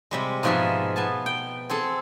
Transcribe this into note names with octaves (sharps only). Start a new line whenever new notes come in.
C3 G3 G#3
G#2 B2 F3 G#4 E5 A5
B3 G#5 A5
G5
C4 G#4 A4